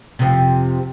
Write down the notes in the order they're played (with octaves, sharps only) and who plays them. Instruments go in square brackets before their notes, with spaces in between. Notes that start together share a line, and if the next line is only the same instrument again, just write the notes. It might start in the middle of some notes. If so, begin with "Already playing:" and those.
[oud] F2 C3